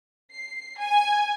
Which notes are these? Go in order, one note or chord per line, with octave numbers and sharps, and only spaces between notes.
C7
G#5